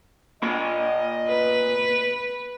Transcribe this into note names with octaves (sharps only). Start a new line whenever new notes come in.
A#2 A#3 D#5 B5
B4